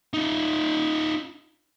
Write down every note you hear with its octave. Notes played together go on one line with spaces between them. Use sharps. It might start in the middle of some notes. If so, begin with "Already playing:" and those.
D#4 F4